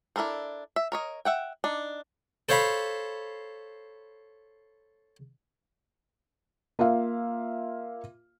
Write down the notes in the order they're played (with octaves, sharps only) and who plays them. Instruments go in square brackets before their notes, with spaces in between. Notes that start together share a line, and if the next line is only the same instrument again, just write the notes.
[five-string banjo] D4 E4 A4 A#4 C5
E5
A#4 C#5 D#5
E5 F#5 G5
D4 D#4
[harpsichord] A4 C5 C#5 F5 B5
[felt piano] A#3 F4 E5 F5